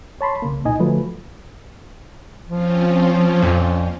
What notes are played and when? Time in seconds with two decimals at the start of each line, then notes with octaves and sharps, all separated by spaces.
0.21 C#5 A5 B5 C6
0.42 C2 C#3 A#3
0.65 C2 A#2 D#4 D#5 G#5
0.79 D3 F3 F#3 A3 F4 B4
2.49 F3 C4 C#4 F4
3.42 F2 A#2